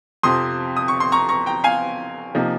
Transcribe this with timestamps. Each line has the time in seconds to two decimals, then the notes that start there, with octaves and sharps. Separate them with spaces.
0.23 F2 C3 F3 C4 C6 D#6
0.77 D#6
0.88 C#6
1.00 C6
1.12 A#5 C#6
1.29 A#5 C#6
1.46 G5 A#5
1.64 F5 G#5
2.35 C3 F3 A#3 D#4